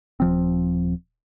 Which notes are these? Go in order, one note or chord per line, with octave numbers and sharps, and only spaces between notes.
D#1 F3 C4